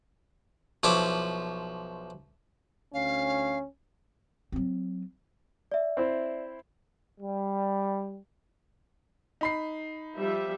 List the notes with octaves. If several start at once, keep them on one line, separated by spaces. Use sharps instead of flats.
B1 F3 E4 C#5 D6
D2 C#4 F5
F#3 C4
D5 E5
C4 E4 C5
G3
D#4 B5 C7
F3 G3 E5